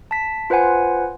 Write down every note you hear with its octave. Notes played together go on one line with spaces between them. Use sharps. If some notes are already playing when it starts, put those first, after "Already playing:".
A5 B6
F4 B4 C5 F#5 G#5